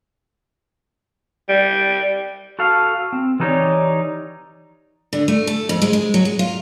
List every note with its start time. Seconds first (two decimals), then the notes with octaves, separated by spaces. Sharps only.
1.49 G3
2.59 F#4 A4 F5
3.13 C4
3.40 E3 F#3 D#4 G4 C#5 D5
5.13 D3
5.28 A3
5.47 A4
5.69 F2
5.82 G#3
5.93 G#3
6.14 F#3
6.25 G#4
6.39 F4